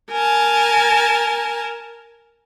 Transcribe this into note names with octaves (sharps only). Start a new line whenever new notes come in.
A#4 G#5 A5